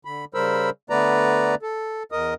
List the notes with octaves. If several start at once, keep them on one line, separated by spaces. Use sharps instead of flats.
D3 B5
C#3 G3 A#4 C5 B5 E6
D3 A3 B3 B4 D5 A#5
A4
E2 A#4 D#5 D#6